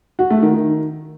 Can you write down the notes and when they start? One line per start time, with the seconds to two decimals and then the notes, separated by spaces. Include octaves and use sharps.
0.19 F#4
0.30 A3
0.42 D#3
0.54 D#3